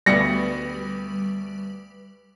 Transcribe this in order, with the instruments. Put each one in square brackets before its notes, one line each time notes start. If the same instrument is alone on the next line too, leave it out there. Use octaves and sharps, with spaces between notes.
[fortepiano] D2 B2 D5 [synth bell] G3 B4 [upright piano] A#6 C#7